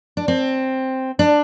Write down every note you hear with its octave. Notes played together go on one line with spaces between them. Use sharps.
D4
C4
D4